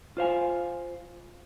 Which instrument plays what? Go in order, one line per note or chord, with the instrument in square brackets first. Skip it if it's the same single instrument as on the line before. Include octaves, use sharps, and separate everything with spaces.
[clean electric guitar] F4 C5 F5 G#5